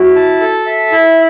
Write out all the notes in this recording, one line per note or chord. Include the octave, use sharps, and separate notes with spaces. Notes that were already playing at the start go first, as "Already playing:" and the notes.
Already playing: E4 F#4
A5
A4
E5
E4